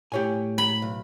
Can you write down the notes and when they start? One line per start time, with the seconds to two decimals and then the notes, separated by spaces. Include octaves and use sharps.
0.12 A2 G4 C#5 G#5
0.58 B5
0.82 B1